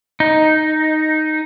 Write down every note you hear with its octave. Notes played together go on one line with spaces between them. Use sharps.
D#4